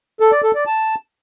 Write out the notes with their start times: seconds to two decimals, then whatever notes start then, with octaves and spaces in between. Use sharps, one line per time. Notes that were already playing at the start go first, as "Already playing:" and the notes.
0.20 A4
0.32 D5
0.43 A4
0.55 D5
0.67 A5